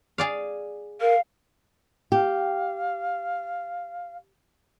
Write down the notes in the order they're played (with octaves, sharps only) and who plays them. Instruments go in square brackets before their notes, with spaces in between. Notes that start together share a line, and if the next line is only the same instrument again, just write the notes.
[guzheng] G#4 D5 F5
[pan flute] A#4 [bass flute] F5
[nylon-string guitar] G4 [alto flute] F5